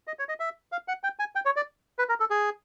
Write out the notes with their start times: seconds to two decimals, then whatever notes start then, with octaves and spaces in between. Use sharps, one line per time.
0.07 D#5
0.19 C#5
0.29 D#5
0.40 E5
0.72 F5
0.88 F#5
1.04 G5
1.19 G#5
1.35 G5
1.45 C#5
1.56 D5
1.99 B4
2.09 A#4
2.20 A4
2.30 G#4